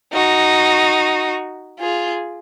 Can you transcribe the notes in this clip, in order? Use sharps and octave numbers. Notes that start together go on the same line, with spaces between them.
D#4 F#4
F4 G#4